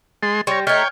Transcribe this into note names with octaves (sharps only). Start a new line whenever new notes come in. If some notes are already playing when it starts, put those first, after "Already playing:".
G#3 C6 A6
G3 C#5 C6 A#6
A3 D#4 C#5 G5 F6 G#6